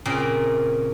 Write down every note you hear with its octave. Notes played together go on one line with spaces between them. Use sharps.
A#2 C#3 A#3 C4